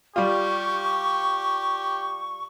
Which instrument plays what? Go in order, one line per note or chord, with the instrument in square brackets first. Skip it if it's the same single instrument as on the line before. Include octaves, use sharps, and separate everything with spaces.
[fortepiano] G3 F4 [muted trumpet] G4 [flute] C#6